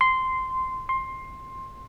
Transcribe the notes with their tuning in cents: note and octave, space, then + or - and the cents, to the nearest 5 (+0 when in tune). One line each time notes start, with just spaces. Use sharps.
C6 -10
C6 +15